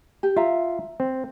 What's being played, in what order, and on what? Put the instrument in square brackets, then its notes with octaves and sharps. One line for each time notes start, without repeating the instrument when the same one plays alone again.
[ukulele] G4
[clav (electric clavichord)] F4 A#5 [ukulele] E5
[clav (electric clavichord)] C4